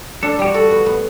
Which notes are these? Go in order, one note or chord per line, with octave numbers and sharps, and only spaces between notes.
D4 A4
G3 G4
F#4
A4
B3
B3